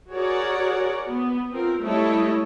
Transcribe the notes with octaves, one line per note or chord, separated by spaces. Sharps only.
F#4 G#4 A#4 C#5 D5 F#5
B3
C4 F4 A#4
G3 A3 E4 A4 C#5 D#5